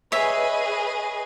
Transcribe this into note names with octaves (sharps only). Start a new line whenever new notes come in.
G#4 B4 C#5 D#5 E5